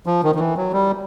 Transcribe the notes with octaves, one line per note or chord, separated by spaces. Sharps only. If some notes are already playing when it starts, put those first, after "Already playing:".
F3
D#3
D#3
E3
F#3
G3